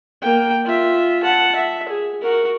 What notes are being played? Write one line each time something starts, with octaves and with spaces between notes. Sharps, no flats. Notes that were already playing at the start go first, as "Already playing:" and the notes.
A#3 G5
F4 E5
F#5 A5
E5
G#4
F#4 A#4